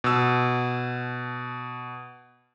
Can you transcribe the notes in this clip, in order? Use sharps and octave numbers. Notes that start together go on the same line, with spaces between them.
B2 E6